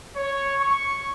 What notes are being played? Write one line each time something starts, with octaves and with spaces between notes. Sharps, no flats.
C#5
C#6